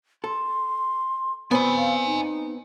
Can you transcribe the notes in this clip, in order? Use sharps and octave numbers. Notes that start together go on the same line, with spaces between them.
A4 C6
B3 C4 D5 G#5 B5
F5
D#4